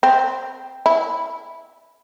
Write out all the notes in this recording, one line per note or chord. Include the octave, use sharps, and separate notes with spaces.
C4
E4